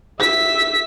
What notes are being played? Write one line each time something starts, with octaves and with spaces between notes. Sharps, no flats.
E5 B6